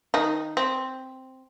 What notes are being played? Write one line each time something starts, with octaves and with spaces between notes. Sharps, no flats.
D#3 D#4
C4